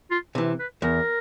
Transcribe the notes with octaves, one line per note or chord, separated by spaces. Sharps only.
F4
C3 E3
B4
E2 A#4